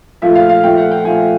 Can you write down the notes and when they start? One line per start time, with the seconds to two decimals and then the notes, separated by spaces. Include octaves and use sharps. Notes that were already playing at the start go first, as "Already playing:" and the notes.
0.22 A#2 F3 A3 E5
0.35 F5
0.49 F5
0.63 A#2 F3 A3 G5
0.77 F#5
0.91 G5
1.05 A#2 F3 A3 G#5